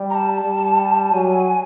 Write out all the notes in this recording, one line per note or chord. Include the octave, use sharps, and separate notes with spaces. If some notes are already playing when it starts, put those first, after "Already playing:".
Already playing: G3
A#5
A5
G3
F#3 G#5